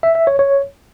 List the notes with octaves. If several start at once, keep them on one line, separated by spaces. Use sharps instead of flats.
E5
E5
C#5
C#5